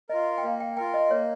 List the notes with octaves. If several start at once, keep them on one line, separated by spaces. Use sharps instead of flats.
F4 A#4 D#5
G5
A#3 F5
G5
F4 A#4 G5
D#5
A#3 C#5